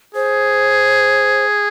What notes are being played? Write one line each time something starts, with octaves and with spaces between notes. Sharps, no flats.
G#4 C5